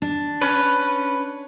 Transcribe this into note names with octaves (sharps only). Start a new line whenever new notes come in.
D4
C#4 B4